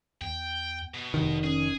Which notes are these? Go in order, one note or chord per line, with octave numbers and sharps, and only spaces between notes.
E2 G5
B2
F1 C2 C3 D#3
C#4 G#4